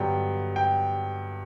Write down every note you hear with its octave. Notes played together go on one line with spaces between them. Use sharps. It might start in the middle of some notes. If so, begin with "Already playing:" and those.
Already playing: G2 D3 F#3 B3 G5
G5